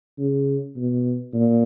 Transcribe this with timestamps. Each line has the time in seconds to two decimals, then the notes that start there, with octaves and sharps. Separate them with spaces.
0.18 C#3
0.76 B2
1.34 A#2